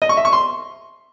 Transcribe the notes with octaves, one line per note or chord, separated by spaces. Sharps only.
D#5
C#6
E5
C#6
C6